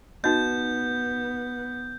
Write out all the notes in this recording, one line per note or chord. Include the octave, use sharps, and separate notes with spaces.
B3 D#4 F#4 D#5 G6